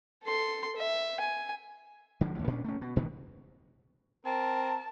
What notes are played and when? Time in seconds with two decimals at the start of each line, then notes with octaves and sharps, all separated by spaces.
0.23 A4 C6
0.76 E5
1.20 G#5
2.21 D3 F3 G#3
2.35 A1 D#2
2.47 A#2 C#4 D4
2.64 A3 C#4
2.81 B2
2.96 C#2 A#2 D#3 B3
4.25 C4 A#4 A5